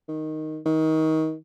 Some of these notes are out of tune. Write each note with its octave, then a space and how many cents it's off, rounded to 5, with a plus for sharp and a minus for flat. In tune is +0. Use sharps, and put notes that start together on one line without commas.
D#3 +0
D#3 +25